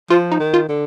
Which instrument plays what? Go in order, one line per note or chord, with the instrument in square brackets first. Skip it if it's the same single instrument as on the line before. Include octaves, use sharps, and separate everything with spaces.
[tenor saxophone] F3 [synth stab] F4
[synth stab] D#4
[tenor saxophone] D#3
[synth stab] F4
[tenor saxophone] D3